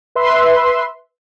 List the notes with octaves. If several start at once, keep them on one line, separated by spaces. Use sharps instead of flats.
B4 E5 C6